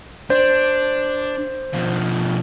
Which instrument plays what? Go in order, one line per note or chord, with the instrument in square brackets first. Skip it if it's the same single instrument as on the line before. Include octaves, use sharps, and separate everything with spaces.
[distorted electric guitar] D4 [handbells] C5
[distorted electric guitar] B2 F3